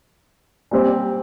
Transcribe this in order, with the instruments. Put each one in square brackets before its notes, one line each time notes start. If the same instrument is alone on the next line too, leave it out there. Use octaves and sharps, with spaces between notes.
[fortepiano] A#2 G3 C4 G4 C5